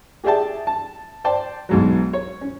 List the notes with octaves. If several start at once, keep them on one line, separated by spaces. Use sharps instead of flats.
G4 G#4 D5 E5 G5 A5
A5
C5 D5 G5 A5
B1 G#2 F#3
C#5
C#4